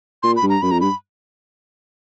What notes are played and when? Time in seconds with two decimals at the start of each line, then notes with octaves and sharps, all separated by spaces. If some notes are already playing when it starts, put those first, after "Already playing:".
0.23 A#2 C6
0.36 B5
0.43 G2
0.50 A#5
0.62 F#2 B5
0.71 F2 A#5
0.81 G2 B5